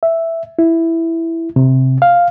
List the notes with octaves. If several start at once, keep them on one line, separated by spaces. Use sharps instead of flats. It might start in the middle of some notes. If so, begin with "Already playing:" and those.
E5
E4
C3
F5